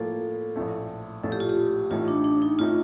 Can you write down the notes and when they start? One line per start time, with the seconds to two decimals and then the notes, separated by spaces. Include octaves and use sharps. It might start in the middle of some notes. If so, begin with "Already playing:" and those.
Already playing: A2 F3 A#3 A4
0.56 A#1 A2 A3
1.23 A#1 A2 A3 A4
1.32 G4
1.40 F4
1.49 G4
1.90 A1 A2 A3 D#4 F4
2.08 D4
2.24 D4
2.42 D#4
2.59 A2 A3 D#4 F4